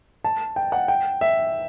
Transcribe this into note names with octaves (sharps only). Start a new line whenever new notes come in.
A5
G5
F#5
G5
E5